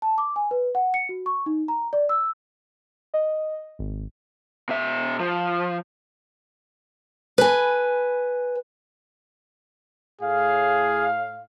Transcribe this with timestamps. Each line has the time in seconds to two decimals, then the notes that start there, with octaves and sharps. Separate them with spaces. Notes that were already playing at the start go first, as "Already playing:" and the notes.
0.02 A5
0.18 D6
0.36 G#5
0.51 B4
0.75 F#5
0.94 C#7
1.09 F#4
1.26 C#6
1.46 D#4
1.68 A#5
1.93 D5
2.09 E6
3.14 D#5
3.79 G#1
4.69 B2 E5
5.20 F3
7.38 B4 G#5
10.21 A2 G#4 F5